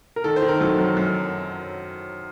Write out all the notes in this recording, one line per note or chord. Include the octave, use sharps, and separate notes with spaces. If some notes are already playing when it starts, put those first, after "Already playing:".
A#4
D#3 A4
C5
D#3
A#4
F#3 A4
F#2
F#2